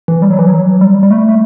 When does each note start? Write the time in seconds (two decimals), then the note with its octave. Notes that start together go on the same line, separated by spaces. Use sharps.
0.08 E3
0.22 G3
0.31 F#3
0.39 E3
0.47 F#3
0.81 G3
1.03 G3
1.11 A3
1.29 A3